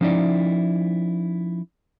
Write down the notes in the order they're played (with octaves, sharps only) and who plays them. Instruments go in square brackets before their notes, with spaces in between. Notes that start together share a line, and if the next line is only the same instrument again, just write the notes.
[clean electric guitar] F3 C#4 D#4 E4 D5